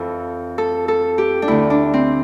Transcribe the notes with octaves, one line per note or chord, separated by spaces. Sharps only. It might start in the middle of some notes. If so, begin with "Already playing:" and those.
Already playing: F2 E3 A4
A4
A4
G4
D4
D2 D3 E4
D4
C4